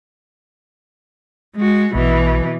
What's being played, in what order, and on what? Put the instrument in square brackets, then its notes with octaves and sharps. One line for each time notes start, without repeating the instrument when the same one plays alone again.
[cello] G#3 F#4
[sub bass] A#1 [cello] B2 E3